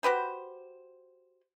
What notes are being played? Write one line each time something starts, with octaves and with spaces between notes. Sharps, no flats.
F#4 G4 B4 C5